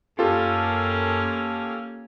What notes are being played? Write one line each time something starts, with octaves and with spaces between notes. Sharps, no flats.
F#2 A#3 C#4 F4 G4 A4